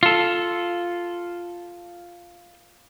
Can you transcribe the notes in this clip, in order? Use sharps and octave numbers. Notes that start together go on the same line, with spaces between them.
F4 A4